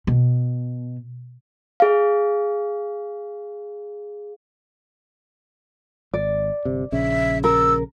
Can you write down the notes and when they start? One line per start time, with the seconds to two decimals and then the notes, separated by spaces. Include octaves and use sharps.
0.07 B2
1.80 G#4 F5
6.14 G#1 D5
6.65 G1 C3
6.92 A#1 C#3 C#4 E5
7.44 A#4 E6